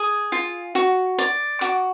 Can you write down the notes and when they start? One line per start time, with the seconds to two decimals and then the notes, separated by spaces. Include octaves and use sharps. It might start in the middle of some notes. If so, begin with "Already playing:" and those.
Already playing: G#4 D#6
0.32 F4
0.75 F#4
1.19 D5
1.61 F#4 D6